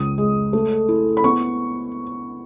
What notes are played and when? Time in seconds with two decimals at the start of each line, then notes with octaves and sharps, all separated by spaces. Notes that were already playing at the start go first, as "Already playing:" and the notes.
Already playing: C#2 D#6
0.18 G#3
0.53 A3
0.89 E4
1.17 B5
1.24 B3 C#6